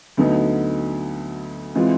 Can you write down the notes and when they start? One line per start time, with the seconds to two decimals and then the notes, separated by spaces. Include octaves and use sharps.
0.17 D2 D3 F#3 B3 D#4
1.75 C3 E3 G#3 C4 F4